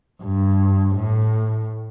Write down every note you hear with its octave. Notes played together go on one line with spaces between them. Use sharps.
G2
A2